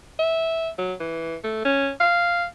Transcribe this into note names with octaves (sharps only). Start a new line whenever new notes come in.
E5
F#3
E3
A3
C#4
F5